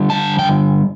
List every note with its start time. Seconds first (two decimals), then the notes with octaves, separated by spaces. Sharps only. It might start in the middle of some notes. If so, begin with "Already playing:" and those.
Already playing: D3 G3
0.10 A5
0.39 G5